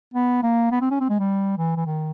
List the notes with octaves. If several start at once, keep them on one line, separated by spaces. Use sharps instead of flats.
B3
A#3
B3
C4
C#4
C4
G#3
G3
E3
E3
D#3